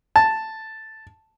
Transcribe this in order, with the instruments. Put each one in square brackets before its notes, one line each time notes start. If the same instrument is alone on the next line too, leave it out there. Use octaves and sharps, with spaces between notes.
[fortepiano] A5